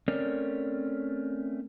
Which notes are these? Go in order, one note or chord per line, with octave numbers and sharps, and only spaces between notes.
A3 C4 C#4 A#4 C#5 D5